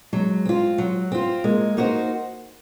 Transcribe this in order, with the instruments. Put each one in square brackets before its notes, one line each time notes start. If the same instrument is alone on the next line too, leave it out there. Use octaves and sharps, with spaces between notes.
[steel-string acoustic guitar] F#3 [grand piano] G#3
[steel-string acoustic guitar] C4 F4
F#3
C4 F4
[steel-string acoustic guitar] G#3 [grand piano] A#3
[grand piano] A#3 [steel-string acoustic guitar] D#4 F#4 C5